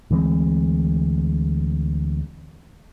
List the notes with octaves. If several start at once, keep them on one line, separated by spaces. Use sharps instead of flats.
D2 E3 G#3 C4